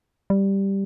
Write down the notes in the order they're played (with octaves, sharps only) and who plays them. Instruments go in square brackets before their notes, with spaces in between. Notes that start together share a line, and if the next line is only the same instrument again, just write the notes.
[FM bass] G3